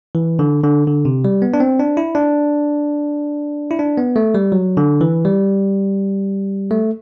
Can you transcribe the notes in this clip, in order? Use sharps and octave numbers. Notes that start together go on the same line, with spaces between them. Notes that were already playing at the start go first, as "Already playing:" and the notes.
E3
D3
D3
D3
C3
G3
B3
D4
C4
D4
E4
D4
E4
D4
B3
A3
G3
F#3
D3
E3
G3
A3